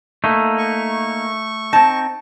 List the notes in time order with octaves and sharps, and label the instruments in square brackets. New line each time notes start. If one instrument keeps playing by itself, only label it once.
[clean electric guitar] A3 [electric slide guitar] A#3 D#4
[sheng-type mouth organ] C#6
[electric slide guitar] C4 D#4 [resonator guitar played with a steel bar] A5